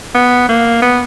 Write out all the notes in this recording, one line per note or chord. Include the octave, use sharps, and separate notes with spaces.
B3
A#3
B3